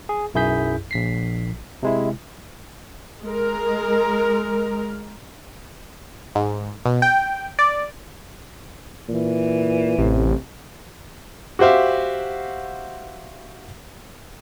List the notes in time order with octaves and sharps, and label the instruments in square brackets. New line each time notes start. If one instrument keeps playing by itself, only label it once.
[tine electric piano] G#4
B1 F#2 E4 G#4 G6 B6
A#1 B6 C7
C3 G#3 E4
[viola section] G#3 A#4
[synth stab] G#2
B2
G5
D5
[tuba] A#2 [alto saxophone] E3
[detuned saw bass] A1 [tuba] C3
[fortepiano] F#4 G4 C5 E5 F5